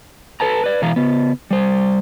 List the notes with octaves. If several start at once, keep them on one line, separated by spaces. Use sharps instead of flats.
A4 B4 A5 A#5
B4 D5
B2 E3 F5 A#5
C#3 B3
G3 C5